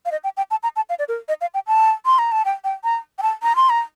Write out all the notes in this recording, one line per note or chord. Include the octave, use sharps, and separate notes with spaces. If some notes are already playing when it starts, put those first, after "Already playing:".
F5
D#5
G5
G5
A5
A#5
A5
F5
D5
A#4
D#5
F5
G5
A5
C6
A#5
A5
G5
G5
A#5
G5
A5
A#5
C6
A#5